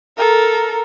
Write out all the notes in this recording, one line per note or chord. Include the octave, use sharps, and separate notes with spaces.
A4 A#4